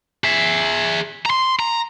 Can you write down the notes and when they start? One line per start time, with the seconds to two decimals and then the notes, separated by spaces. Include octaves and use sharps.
0.24 G#4 E5
1.26 A#5 C6
1.59 A#5